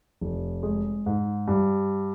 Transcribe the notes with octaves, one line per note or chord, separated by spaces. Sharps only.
F1
G#3
G#2
G2